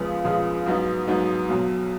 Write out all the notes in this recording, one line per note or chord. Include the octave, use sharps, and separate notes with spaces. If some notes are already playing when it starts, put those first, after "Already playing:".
Already playing: C#2 C#3 F3 G#3 B3
C#2 C#3 F3 G#3 B3
G#2 F#3 B3 D#4
G#2 F#3 B3 D#4
B1 B2 F#3